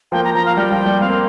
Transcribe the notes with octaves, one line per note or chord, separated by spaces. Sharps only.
F3 A#3 G5
A#5
F3 A#5
F5
G3 G5
F3
G3
C4 F5
A#3